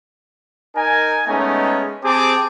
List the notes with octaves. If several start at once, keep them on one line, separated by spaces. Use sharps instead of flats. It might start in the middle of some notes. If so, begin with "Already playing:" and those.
D#4 A#4 G#5
G#3 A3 B3 C#4 D#4
C4 G4 G#4 A5 D6